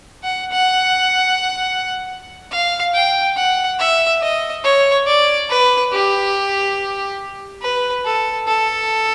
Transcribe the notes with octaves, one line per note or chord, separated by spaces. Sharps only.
F#5
F#5
F5
G5
F#5
E5
D#5
C#5
D5
B4
G4
B4
A4
A4